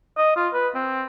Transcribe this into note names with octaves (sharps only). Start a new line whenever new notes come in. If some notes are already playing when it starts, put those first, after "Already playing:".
D#5
F4
B4
C4